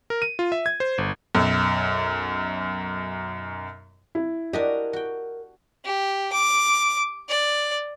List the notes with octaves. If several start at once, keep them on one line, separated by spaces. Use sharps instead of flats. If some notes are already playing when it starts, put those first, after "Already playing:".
A#4
D#7
F4
E5
G#6
C5
G1
B1 F#2
E4
D4 F#4 G4 A#4 D#5
F#4 G5
G4
D6
D5